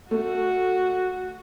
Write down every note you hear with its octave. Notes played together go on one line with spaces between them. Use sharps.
A3 F#4